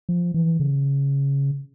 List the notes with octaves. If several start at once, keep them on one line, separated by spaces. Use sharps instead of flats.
F3
E3
C#3